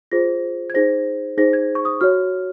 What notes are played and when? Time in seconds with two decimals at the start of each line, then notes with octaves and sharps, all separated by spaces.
0.12 F4 G#4 C5 A#6
0.70 G#6
0.74 D#4 G#4 C5 A#6
1.38 D#4 G#4 C5 A#6
1.53 G#6
1.75 C#6
1.85 D#6
2.01 F#4 C#5 F6